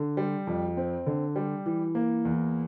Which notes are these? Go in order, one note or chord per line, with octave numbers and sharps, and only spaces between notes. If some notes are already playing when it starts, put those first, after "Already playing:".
Already playing: D3
G3
F2
C4
D3
G3
E3
A#3
E2